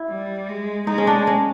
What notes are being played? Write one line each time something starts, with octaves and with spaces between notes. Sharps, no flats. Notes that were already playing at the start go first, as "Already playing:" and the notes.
Already playing: E4
G3
G#3
G#3 D#4
C#4
D4
C#4